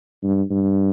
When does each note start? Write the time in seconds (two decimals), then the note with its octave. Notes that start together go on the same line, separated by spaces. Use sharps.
0.23 G2
0.51 G2